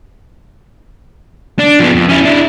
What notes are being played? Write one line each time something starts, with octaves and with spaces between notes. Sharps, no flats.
D4
F3 B3
F2
C#4 E4
D4 E4